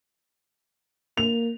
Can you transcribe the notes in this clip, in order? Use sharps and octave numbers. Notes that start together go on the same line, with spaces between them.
A#3 F7